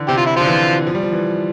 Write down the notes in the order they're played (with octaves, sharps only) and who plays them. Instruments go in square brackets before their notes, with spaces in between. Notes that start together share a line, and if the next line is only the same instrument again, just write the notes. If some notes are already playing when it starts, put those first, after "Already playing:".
Already playing: [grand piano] D3 E3
[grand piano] C3 [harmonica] G4
[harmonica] F4
E4
[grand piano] D3 [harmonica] F3 F4
[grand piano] E3
F3
G3
F3
E3